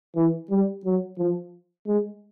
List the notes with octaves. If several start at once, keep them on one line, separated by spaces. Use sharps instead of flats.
E3
G3
F#3
F3
G#3